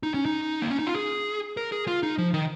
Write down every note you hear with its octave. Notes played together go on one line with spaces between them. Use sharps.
D#4
C#4
D#4
A#3
C#4
D#4
F4
G#4
A#4
G#4
F4
D#4
F3
D#3